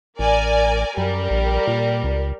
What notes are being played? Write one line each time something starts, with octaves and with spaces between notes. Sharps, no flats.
A1 A#4 D5 G#5
F#2 G3 A#4
A#1
A#2
C#2